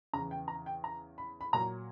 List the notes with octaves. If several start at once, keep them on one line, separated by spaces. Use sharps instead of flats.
E2 C#3 E3 A#5
G5
A#5
G5
A#5
B5
B5
A#2 F#3 A#5